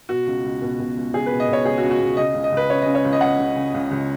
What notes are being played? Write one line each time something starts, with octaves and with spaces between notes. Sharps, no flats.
B2 F#4
C#2
C#2
B2
B2
C#2
C#2 G#4
B4
B2
D#5
B2 C#5
C#2 G#4
F#4
C#2
F#4
B2
C#3 D#5
C#2
D#5
C#2
B4
C#3 C#5
C#3 D#5
C#5
C#2
D#5
C#2 F#5
C#3
C#3
C#2
C#2